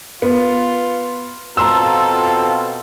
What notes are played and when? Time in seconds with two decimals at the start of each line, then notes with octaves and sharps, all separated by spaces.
0.22 B3 F4
1.57 B2 C4 F4 A4 A#5 C6 E6